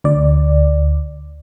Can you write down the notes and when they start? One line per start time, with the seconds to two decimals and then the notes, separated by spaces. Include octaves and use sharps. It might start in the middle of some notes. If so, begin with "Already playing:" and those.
0.04 D2 D5